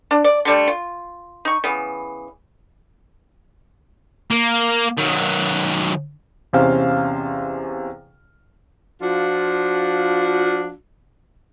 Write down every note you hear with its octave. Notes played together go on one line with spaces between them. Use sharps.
D4
D5
D3 G3 A3
F4
D#4 C#6
C#3 E3 B3
A#3
D#3 F#3
E2 C3 C#4 C5 F5 F6
F3 D4 F4 F#4